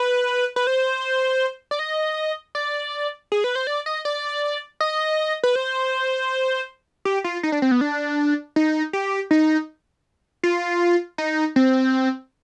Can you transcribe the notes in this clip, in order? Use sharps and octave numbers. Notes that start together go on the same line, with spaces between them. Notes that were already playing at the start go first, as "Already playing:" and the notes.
Already playing: B4
B4
C5
D5
D#5
D5
G#4
B4
C5
D5
D#5
D5
D#5
B4
C5
G4
F4
D#4
D4
C4
B3
D4
D#4
G4
D#4
F4
D#4
C4